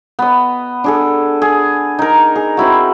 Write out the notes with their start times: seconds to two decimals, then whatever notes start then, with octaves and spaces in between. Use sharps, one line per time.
0.19 B3 D#5
0.84 D4 G#4 A4
1.42 G#4
1.99 D#4 A#4
2.36 G#4
2.57 C4 E4 F#4